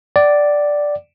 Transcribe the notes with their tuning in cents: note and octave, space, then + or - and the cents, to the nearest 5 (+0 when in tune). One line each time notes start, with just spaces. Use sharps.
D5 +0 F#5 +45